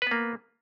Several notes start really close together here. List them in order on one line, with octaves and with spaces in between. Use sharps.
B4 B3 A#3